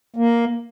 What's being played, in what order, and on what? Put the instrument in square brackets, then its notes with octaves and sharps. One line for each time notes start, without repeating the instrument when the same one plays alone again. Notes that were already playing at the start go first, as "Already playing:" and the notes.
[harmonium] A#3